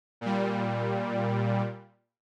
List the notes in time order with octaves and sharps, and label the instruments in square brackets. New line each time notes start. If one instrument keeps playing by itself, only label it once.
[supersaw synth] A#2 G3